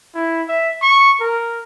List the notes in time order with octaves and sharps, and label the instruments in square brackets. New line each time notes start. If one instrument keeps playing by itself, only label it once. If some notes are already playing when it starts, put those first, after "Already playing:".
[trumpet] E4
E5
C#6
A#4